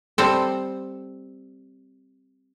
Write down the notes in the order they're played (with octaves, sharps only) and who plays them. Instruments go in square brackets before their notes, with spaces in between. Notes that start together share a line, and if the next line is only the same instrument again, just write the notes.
[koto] G3 C4 A4